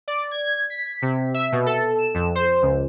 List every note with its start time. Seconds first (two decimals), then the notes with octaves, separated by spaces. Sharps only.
0.08 D5
0.31 G#6
0.70 B6
1.02 C3
1.34 E5
1.52 B2
1.66 A4
1.99 E7
2.14 F2
2.35 C5
2.62 C#2